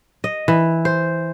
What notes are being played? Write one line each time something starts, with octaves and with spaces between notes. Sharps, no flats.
D#5
E3
C5